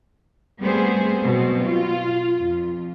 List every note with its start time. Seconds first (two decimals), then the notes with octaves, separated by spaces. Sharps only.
0.61 G3 A3 B3 C4 G#4 C5
1.22 B2 F#3 C4
1.64 F4
2.40 F2